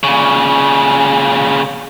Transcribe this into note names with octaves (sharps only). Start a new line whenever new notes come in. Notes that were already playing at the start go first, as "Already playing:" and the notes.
A#2 C#3